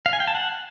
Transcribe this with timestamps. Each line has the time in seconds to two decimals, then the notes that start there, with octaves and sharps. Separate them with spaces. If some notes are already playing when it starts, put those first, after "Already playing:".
0.06 F5
0.13 G#5
0.20 G5
0.27 A5
0.35 F#5